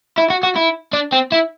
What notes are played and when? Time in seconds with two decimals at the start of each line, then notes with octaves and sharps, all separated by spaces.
0.18 E4
0.30 F#4
0.43 F#4
0.56 E4
0.93 D4
1.12 C4
1.32 E4